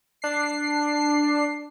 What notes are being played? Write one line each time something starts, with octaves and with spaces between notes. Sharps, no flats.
D4 C7